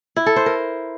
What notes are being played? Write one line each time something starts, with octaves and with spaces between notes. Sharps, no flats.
E4
A4
C5
A#4